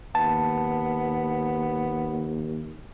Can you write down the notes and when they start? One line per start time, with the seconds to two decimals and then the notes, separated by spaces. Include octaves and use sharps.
0.15 D#2 B3 A5